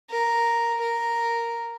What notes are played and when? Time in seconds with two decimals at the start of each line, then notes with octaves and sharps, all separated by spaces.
0.11 A#4
0.82 A#4